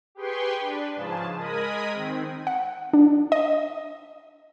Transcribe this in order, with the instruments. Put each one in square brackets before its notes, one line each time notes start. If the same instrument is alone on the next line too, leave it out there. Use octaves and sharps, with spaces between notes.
[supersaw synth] G4 G#4 B4 G5 C6 C#6
D4 B4
G#2 C#3 F3 G#4 A5
G#3 A#4 D#5 G#5 B5 D#6
D#3 C4
[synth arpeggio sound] F#5
D4
D#5